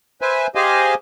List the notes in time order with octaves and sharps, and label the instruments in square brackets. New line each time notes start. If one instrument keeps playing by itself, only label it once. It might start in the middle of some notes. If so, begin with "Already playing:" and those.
[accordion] B4 C5 E5 G#5
G4 G#4 C5 D#5 F5 G#5